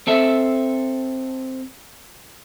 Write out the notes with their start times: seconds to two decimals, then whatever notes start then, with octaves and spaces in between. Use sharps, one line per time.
0.07 C4 A4 E5